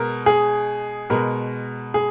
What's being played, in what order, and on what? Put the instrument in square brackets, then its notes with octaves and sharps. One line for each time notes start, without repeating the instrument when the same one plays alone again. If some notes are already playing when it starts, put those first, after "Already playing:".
Already playing: [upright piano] B2 G#3 B3 A#4
G#4
B2 G#3 B3 A#4
G#4